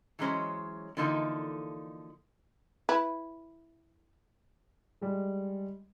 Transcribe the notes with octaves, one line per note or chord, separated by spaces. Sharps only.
E3 F#3 G#3 C#4 C5
D3 E3 F3 A#3 D#4 A4
E4 B4
G3 G#3